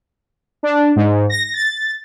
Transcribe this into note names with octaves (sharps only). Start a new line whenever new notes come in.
D4
G#2
A#6
A6